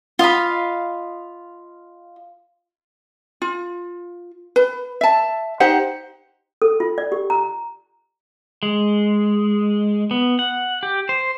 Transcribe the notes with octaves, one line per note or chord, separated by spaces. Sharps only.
F4 D#5 F5 B5
F4
B4
E5 A5
D#4 G4 C5 F#5
A4
F4
D5
G4
A#5
G#3
B3
F#5
G4
C5